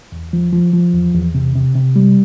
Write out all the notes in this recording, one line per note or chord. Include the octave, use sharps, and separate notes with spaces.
E2
F3
F3
F3
E2
E2
C3
C3
C3
G3